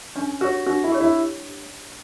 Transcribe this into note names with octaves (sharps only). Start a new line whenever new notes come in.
C#4 D4
F#4 G4 C#5
D4 F#4
E4
G4 C#5
E4